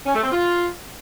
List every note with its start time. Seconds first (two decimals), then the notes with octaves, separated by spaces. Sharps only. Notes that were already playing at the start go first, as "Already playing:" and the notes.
0.06 C#4
0.14 A3
0.23 C4
0.31 F4